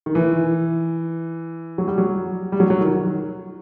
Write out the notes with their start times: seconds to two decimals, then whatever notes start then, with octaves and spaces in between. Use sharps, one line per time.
0.06 D#3
0.15 E3
1.78 F#3
1.88 G3
1.98 F#3
2.52 G3
2.60 F#3
2.70 F#3
2.80 D#3